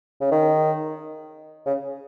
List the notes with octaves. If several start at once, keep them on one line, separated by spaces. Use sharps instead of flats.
C#3
D#3
C#3